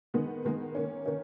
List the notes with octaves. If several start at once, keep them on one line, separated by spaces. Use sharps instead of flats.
D#3 G#3 B3 D#4
D#3 G#3 B3 D#4
D#3 A#3 C#4
D#3 A#3 C#4